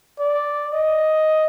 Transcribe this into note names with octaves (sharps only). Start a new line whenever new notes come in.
D5
D#5